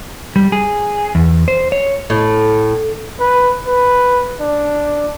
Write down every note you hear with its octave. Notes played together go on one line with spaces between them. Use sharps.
G3
G#4
E2
C5
C#5
A2
B4
B4
D4